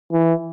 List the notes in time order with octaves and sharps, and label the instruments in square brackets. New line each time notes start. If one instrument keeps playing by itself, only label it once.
[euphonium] E3